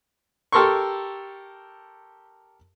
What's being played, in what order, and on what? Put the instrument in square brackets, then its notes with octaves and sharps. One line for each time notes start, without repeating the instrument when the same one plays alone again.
[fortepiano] G4 A4 A#4 C6 C#6